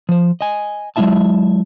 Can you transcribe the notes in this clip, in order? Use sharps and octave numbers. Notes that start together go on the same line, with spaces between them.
F3 C5
D#5 G#5
F#3 G#3 A3 E4 E5 A5